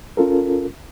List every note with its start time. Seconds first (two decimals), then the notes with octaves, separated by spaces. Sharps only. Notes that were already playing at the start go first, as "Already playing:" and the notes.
0.17 C#4 F4 A4 A#4